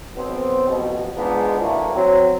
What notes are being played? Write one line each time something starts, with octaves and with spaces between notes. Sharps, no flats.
B1 B2 B3 C4
A1 F2 B2
G#2 G#3 B3 D4 F4
D3 E3 F#3 A3 A#3
F#3 C4